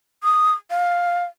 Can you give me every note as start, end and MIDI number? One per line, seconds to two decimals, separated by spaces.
0.23 0.53 87
0.70 1.25 77